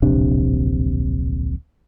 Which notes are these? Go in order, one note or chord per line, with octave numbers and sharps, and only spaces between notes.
D1 A#1 C3 D4